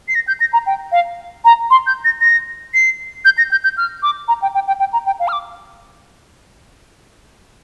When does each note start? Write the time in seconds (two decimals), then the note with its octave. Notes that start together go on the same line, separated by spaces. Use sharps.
0.08 C7
0.15 A#6
0.28 G6
0.40 A#6
0.53 A#5
0.66 G5
0.92 F5
1.45 A#5
1.71 C6
1.87 G6
2.05 A#6
2.21 A#6
2.74 C7
3.25 G6
3.38 A#6
3.51 G6
3.64 G6
3.77 F6
4.03 D6
4.28 A#5
4.42 G5
4.54 G5
4.67 G5
4.80 G5
4.93 A#5
5.06 G5
5.20 F5
5.28 F6
5.32 D6